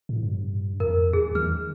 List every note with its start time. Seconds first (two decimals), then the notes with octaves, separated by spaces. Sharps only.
0.09 A2
0.23 G2
0.80 F2 A#4
1.13 E2 G#4
1.35 D#3 F6